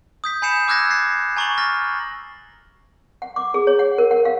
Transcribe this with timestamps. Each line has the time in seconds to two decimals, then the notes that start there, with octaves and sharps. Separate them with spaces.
0.24 D#6 G6 B6
0.42 G#5 B5 G6 C7 C#7 E7
0.68 D6 E6 F#6 G#6 A#6
0.90 A6 A#6 C7
1.36 G#5 A#5 C#6 A6 F#7
1.58 F6 A6 A#6
3.22 F#5
3.36 D6
3.54 G#4
3.67 C#5
3.79 F#5
3.98 A#4
4.11 F#5
4.25 F5